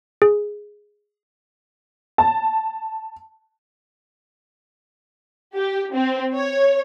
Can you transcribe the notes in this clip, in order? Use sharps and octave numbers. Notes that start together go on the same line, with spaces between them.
G#4
A5
G4
C4
C#5